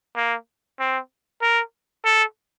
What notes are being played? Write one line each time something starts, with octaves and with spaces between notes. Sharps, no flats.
A#3
C4
A#4
A4